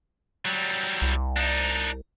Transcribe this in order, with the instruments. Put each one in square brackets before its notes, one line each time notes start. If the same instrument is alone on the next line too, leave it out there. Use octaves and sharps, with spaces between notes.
[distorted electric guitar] F#3 G3
[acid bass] C2
[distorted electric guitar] D4 D#4